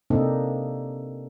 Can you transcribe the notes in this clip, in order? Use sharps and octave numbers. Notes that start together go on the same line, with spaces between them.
C3 A#3 C4 D4 D#4 A4